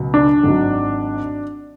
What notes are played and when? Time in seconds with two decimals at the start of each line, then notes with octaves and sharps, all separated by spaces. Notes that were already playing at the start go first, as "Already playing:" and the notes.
Already playing: C#2 B2 F#3
0.14 D4
0.43 G#1 G#2 F#3